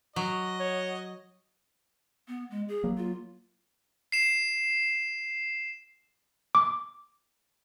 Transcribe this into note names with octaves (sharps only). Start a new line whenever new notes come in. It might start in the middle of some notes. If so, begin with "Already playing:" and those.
F#3 F#4 D#5
C#5
B3
G#3
G#4
F#3 A#3
F4
C7 E7
D6